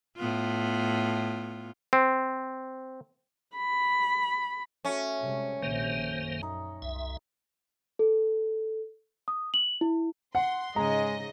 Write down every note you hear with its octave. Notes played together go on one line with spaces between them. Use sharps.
A2 B3 F4
C4
B5
A3 C#4 F#4
C3 G3 G#3
A#1 C3 D#3 A#3 C5
F#2
D#4
C2 E5
A4
D#6
F#7
E4
F#5 C6
G#2 C#3 G#3 D#5 A#5